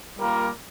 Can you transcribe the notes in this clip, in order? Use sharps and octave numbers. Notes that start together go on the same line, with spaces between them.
G3 A#3 F4 A#4